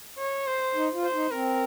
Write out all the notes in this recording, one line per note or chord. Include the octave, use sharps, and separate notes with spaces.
C#5
C5
D#4
F4
C5
D#4
C4 A#4